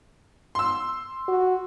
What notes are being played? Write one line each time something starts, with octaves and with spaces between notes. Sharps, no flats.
C6 E6
F#4